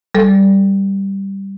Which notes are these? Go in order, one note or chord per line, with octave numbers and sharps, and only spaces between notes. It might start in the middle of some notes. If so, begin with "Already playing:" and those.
G3 A4